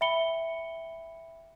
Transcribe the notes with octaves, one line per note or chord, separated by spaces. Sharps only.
E5 G5 B5 C#7 G7